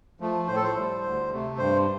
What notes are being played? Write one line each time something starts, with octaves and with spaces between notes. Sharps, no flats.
F3 A3
A2 C5
A4
C5
G3
D2
C3 A3
G2 C5